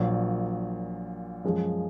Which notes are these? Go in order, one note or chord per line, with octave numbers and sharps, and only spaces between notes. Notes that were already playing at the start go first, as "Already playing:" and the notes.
Already playing: A#1 A#2 F#3
F#2 F3 G#3